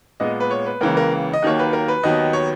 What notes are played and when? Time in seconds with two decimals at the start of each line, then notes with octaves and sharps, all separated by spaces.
0.20 A#2 G#3 B3 D#5
0.40 B4
0.51 C#5
0.66 B4
0.81 C#2 C#3 E3 A#3 A#4
0.97 A#4
1.33 D#5
1.42 D#2 D#3 F#3 A#3 C#5
1.59 B4
1.73 A#4
1.88 B4
2.03 D#2 D#3 F#3 B3 D#5
2.33 C#5